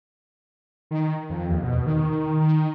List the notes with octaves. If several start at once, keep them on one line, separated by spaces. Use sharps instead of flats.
D#3
F2
D#2
B2
D#3
D#3